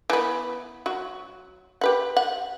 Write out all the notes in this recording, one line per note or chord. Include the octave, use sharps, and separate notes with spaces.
E3 B3
F#3 F#4
G4 B4 F#5
F#5